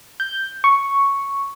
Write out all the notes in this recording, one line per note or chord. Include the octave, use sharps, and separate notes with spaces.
G6
C#6